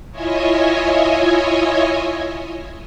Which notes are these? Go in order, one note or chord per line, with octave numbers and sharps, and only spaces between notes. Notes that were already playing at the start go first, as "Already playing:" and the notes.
E4 F4 C#5 D#5 E5 G#5